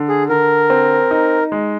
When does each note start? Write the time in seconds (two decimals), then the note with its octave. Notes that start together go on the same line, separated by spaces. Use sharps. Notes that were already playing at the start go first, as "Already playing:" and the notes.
Already playing: D3
0.09 G#4
0.29 D3 A#4
0.70 C4
1.11 D#4
1.52 G#3